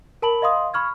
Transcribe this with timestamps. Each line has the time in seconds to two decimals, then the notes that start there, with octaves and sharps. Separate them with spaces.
0.22 A#4 A5 B5 F#7
0.42 D#5 F5 C6 D#6
0.74 B5 C#6 F6 G#6